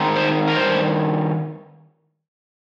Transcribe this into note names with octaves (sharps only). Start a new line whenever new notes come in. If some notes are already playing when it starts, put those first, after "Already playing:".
Already playing: D#3 G#3 C4 D#4
C5
A#4
G2 D#3 C5